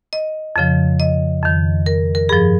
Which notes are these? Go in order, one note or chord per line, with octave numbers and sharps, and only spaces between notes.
D#5
F2 C#3 F3
D#5
F2 D#3
A#4
A#4
G2 F3 G#4